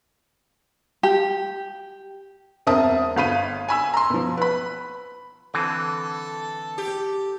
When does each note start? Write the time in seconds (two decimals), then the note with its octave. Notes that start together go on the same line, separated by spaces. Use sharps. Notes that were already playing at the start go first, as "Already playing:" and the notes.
1.03 G4
2.67 E1 C4 A#4 E5 A5 D#6
3.16 G1 F5 B5 D#7
3.68 G#5 B5 E6
3.94 A#5 C6
4.10 B2 F3
4.37 B4 B5
5.54 D3 E3 C4 A4
6.78 G4